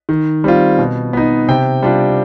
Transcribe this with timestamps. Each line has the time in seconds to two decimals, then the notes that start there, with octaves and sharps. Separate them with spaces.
0.09 D#3
0.44 G3 C4 F4
0.79 B2
1.13 B3 D#4
1.48 C3 G5
1.83 G3 D4 F4